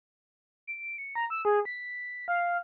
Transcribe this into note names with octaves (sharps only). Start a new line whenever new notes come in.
D7
C#7
A#5
E6
G#4
B6
F5